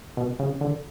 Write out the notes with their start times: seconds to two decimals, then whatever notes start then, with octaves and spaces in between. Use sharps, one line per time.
0.17 B2
0.39 C#3
0.61 D3